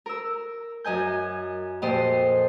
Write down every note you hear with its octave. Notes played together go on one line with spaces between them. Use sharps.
A#4 E6
F#2 D#5 G#5 G6
F2 A#2 G4 C5 D#5 C6